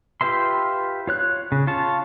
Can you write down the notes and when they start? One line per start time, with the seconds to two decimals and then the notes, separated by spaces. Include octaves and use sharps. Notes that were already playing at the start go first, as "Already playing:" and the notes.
0.21 F4 G4 B4 E5 C6
1.07 F4 C#5 F#6
1.52 C#3
1.67 F4 C#5 A5